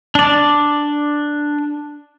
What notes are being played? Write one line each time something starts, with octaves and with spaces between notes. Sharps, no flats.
D4 D5